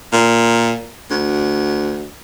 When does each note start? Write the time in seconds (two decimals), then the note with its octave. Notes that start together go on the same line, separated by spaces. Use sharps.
0.13 A#2
1.11 D2